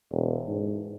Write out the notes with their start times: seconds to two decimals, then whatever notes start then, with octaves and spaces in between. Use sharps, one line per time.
0.12 E1
0.47 G#2